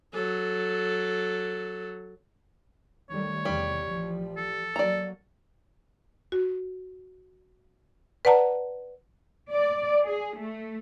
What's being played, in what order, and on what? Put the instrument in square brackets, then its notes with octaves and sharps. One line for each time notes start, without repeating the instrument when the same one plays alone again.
[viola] F#3 A4
[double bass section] D#3 G3 A3 [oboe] C#5
[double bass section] E2 C3 [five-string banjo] G3
[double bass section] A1 F3
[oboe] A4
[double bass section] F#3 A#3 [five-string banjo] D5 A#5
[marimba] F#4
B4 D5 F#5 A5 A#5
[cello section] D5
G#4
A3